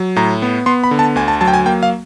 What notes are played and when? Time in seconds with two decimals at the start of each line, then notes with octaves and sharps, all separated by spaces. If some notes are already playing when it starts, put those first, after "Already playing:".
Already playing: F#3
0.16 A2 A#5
0.42 B3
0.66 B3 C6
0.84 B5
0.91 D3
0.99 A5
1.16 D2 G#5
1.28 A5
1.41 F#3 A5
1.48 G5
1.54 G#5
1.66 A#3 G5
1.83 F5